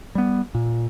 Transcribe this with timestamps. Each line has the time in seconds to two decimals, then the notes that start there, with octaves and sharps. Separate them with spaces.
0.15 G3 B3
0.55 A#2